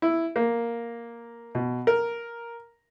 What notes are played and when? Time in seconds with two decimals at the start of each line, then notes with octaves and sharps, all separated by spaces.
0.02 E4
0.36 A#3
1.55 B2
1.87 A#4